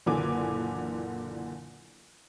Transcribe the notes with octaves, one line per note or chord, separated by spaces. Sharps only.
F#1 A#2 D3 E3 G#5 D6